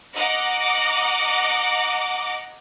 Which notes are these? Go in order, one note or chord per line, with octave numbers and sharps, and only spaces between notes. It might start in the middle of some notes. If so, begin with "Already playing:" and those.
D#5 F#5 A#5 D6